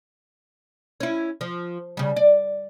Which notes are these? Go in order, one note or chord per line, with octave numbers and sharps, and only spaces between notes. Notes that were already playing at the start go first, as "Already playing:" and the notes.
C#4 E4
F3
C#3 G3
D5